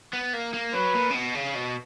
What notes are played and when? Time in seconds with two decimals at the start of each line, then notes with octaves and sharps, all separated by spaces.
0.13 B3
0.33 A#3
0.54 A#3
0.73 F#3 B4
0.94 A#2
1.10 C#3
1.14 B2
1.35 C#3
1.55 B2